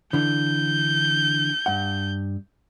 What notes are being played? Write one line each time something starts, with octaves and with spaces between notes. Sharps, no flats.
D3 E3 G6
G2 F#5